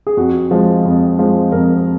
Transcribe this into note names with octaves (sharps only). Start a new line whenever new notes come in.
G#4
F2 F#4
F3 G#3
F2
F3 G#3
F2 A#4